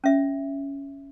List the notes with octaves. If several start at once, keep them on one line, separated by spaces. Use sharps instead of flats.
C#4 E5